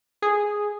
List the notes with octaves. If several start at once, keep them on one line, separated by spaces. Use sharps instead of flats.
G#4